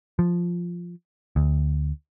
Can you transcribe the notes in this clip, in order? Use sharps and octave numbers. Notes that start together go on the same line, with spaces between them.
F3
D2